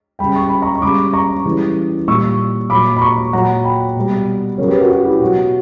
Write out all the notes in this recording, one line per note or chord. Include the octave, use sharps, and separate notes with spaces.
C#3 G3 G5 B5
C#6
B5
A#5 C#6
C#6
C#3 G3 B5 D6
A#5 C#6
C#3 E3 G3
A#2 G3 C#6 E6
A#2 F#3 B5 D6
B5
A#5 C#6
A#2 F#3 F#5 A#5
G5 B5
B2 G3
C#3 F#3 A#4 C#5
G4 B4
F#4 A#4
F#4
E4 G4
B2 F#3 F#4